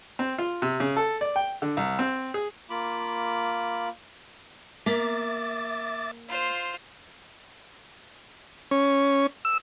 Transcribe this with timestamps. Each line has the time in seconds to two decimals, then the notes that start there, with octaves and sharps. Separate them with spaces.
0.19 C4
0.38 F4
0.62 C3
0.80 C#3
0.97 A4
1.21 D5
1.36 G5
1.62 D3
1.77 C2
1.99 C4
2.34 G#4
2.70 A#3 F4 B5 D6
4.86 A#3 E5 D6 A6
6.28 F4 C5
8.71 C#4
9.45 E6